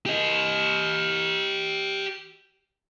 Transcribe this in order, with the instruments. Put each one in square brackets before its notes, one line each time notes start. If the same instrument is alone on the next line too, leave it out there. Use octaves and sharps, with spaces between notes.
[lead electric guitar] G4 D#5